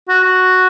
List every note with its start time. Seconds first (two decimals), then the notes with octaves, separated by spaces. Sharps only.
0.09 F#4
0.24 F#4